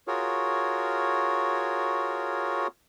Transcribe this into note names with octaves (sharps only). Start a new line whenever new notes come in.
F4 F#4 G#4 A#4 C#5